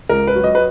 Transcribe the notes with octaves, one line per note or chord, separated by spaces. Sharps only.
C#2 A#4
B4
F#3
D#5
B4